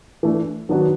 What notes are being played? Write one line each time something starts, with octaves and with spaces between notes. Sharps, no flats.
E3 A3 D4
D#3 F#3 B3 D4 F#4